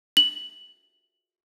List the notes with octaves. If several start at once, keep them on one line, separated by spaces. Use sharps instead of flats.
F#7